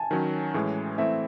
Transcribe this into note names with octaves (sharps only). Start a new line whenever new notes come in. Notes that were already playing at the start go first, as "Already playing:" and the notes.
Already playing: G#5 A5
D#3 F#3 C#4
A2 E3 G#3 C#4
E3 A3 C4 E4 E5